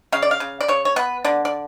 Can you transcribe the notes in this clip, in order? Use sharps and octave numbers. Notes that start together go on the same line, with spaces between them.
C#3 F5
D5
F5
C#3
D5
C#3 C#5
C#5
B3 B4
D3 D5
D5